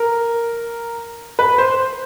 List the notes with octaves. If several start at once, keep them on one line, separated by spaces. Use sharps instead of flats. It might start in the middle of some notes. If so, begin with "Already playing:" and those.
Already playing: A#4
B4
C5